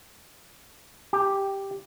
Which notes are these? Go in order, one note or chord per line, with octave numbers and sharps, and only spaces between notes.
G4